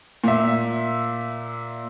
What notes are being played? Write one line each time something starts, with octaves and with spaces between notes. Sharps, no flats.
A#2 E5